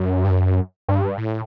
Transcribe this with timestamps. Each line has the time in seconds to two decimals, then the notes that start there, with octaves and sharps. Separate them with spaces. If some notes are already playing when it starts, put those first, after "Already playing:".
Already playing: F#2
0.24 G2
0.29 F#2
0.88 G2
1.18 A2